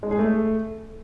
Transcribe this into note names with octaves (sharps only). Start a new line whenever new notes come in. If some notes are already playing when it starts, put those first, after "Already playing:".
G#3
G#4
A3